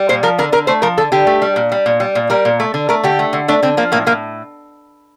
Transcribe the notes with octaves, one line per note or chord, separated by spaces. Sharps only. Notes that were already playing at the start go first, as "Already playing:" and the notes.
Already playing: G3
A#2 C5
F3 A#4
D3 A#4
D3 A#4
A3 C5
F3 A#4
D3 A4
D3 G4
A3
G3
A#2
G3
A#2
G3
A#2
G3 A#4
A#2
A3
D3
A3 A#4
D3 G4
A3
D3
A3 D4
D3 C4
F3 A#3
A2 A#3
A2 A#3